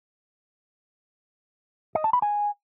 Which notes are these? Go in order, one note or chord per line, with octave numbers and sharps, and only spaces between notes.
D#5
A5
B5
G#5